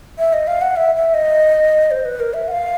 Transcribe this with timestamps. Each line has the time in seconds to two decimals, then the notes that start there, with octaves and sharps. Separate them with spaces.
0.19 E5
0.33 D#5
0.47 F5
0.62 F#5
0.76 E5
0.95 E5
1.14 D#5
1.91 C5
2.05 B4
2.20 A#4
2.34 E5
2.48 F#5
2.51 F5